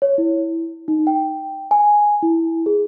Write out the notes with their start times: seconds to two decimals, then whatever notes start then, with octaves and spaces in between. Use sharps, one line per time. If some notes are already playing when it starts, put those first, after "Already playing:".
0.02 C#5
0.18 E4
0.88 D#4
1.07 G5
1.71 G#5
2.23 E4
2.66 G#4